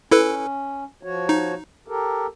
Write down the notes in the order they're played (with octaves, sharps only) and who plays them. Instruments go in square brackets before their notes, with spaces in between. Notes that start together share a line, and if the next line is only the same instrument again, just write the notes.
[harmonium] C#4 [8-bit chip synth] E4 A4 B4
[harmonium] F3 F#4 C#5
[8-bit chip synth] D#4
[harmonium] G4 A4 A#4